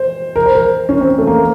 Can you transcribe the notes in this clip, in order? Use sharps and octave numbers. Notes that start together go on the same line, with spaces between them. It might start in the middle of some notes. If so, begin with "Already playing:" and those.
Already playing: C5
A#4
C5
A#4
C#4
C4
A3
A#3